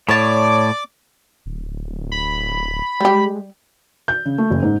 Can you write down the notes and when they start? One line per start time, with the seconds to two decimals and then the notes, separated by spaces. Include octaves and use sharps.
0.09 A2 C#5 D5 A5 D6
1.46 D1
2.12 B5
3.01 G3 G#3 G4
4.08 G6
4.26 C#3
4.38 A3
4.50 F#1
4.63 G#2